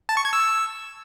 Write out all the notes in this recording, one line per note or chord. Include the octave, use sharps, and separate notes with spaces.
A5
C#6
G#6
E6